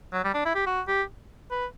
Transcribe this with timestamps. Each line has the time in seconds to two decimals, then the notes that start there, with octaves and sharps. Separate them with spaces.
0.12 F#3
0.24 G3
0.34 D4
0.45 E4
0.55 G4
0.66 F#4
0.87 G4
1.51 B4